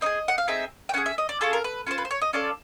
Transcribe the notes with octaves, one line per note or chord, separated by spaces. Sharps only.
C4 D#4 G#4 D#5
F#5
F5
C4 D#4 G#4 E5
G5
C#4 F4 G#4 F#5
E5
D#5
D5
C#4 F4 G#4 A4
A#4
B4
C#4 F4 A4 C5
B4
C5
C#5
D#5
C#4 F4 A4 D5